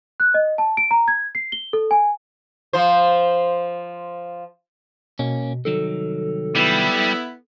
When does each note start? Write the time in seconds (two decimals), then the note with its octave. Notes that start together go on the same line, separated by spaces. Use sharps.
0.20 F#6
0.34 D#5
0.58 A5
0.77 D7
0.91 A#5
1.08 G#6
1.35 C7
1.52 G7
1.73 A4
1.91 G#5
2.73 F3 C5
5.19 B2 A#3 C#4
5.65 C2 D#3 F#3 A4
6.55 G3 B3 E4